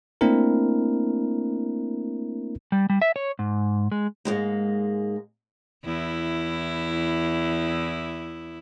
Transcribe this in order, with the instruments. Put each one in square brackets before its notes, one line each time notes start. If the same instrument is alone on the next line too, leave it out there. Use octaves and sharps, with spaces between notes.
[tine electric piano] A3 A#3 C4 D4 E4 A#4
[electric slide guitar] G3
G3
E5
C#5
G#2
G#3
[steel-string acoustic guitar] G#2 G#3 A#3
[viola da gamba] E2 E4